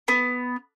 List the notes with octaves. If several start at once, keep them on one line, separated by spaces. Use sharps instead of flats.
B3